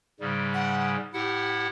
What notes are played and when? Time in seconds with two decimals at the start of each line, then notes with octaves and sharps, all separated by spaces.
0.20 G#2 C#3 G3
0.54 F#5
1.13 A2 E4 G4 F#5